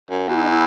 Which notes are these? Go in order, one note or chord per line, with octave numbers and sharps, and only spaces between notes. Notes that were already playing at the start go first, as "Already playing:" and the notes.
F#2
E2 F#4
E4
D#4
E4